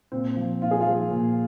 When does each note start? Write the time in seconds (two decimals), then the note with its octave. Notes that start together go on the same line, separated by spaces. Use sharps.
0.12 A#2 C4
0.37 F3
0.61 A#2 F4
0.71 G#4
0.81 F4
0.86 F3
1.11 A#2